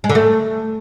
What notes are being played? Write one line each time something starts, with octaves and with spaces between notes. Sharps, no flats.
G#3
D3
A3